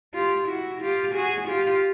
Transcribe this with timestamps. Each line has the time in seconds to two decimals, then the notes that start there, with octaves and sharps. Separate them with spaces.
0.14 F4 G4
0.48 E4 F#4
0.81 F4 G4
1.14 F#4 G#4
1.48 F4 G4